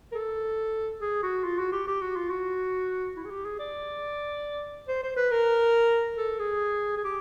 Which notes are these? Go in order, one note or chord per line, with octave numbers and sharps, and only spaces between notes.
A#4
A4
G#4
F#4
F4
F#4
G4
G4
F#4
F4
F#4
E4
G#4
G4
G#4
D5
C5
C5
B4
A#4
A4
G#4
G#4
G4